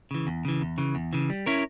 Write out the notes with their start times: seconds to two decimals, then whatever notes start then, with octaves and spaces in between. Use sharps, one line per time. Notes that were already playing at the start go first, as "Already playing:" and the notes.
0.11 C#3 E3
0.27 E2
0.45 C#3 E3
0.61 E2
0.78 C#3 E3
0.95 E2
1.13 C#3 E3
1.30 G3
1.46 C#4 E4 A#4 C#5